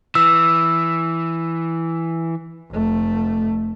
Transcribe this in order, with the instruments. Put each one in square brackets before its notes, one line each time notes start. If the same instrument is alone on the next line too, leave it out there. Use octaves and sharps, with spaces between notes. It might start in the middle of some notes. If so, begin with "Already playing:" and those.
[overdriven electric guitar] E3 [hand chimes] E6
[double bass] F1 A3